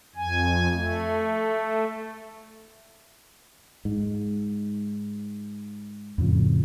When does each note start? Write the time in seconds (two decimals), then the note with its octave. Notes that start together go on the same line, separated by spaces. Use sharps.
0.16 F2 G#5
0.71 A3
3.85 G#2
6.18 F2 A2 C#3 F3